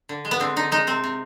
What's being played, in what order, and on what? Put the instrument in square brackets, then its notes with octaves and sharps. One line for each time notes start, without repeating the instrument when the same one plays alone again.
[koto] D3
G#3
B3
D3 C4
D3 D#4
G#3 D#4
C3 C4
C3